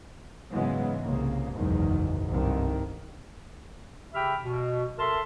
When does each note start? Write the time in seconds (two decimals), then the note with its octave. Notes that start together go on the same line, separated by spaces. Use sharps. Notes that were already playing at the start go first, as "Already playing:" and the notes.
0.52 G#2 C#3 E3 F#3 G#3 B3
1.02 C2 C#3 A#3
1.55 F#1 B1 E2 G#2 D#3
2.30 G1 C2 A2 D3 D#3
4.14 C#3 G4 E5 G5 B5 F6
4.42 B2
4.99 A4 A#4 E5 A5 C6